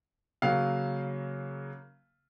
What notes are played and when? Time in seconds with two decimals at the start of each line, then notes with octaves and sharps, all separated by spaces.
0.42 C#3 F#3 A#3 F5